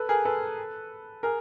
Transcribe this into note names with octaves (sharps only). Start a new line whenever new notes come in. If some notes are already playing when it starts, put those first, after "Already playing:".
Already playing: A4 B4
G#4 A#4
A4 B4
G#4 A#4